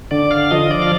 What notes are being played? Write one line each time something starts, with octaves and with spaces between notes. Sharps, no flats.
D3 D5
F5
F3 D#5
D5
F5